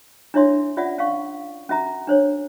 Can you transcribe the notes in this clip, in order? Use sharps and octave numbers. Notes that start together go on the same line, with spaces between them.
D4 E4 C#5 E5 C6
C#4 F4 D5 E5 F#5
C#4 F5 C#6
C#4 F#4 E5 A#5
D4 C5 C#5